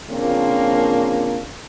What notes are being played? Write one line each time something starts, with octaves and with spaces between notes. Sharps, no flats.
A#2 C#3 F3 A#3 C4 D4